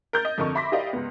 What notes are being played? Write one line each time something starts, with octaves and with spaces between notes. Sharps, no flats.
A#4 G6 A6
D#5
F2 D3 A#4 D#5 C#6
E5 B5 C6 D6 A#6 B6
E4 G4 A#4 D5 D#5 F5
C#2 B3